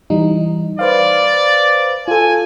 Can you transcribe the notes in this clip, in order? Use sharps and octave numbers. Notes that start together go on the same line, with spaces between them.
E3 G3 D#4
B4 C5 D5 F5
F4 A4 G#5